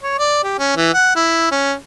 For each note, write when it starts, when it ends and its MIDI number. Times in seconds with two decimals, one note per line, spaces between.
0.03 0.14 73
0.19 0.40 74
0.44 0.57 67
0.59 0.74 61
0.77 0.90 52
0.94 1.14 78
1.16 1.50 64
1.52 1.73 61